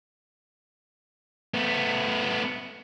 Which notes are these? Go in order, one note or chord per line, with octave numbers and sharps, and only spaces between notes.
A3 B3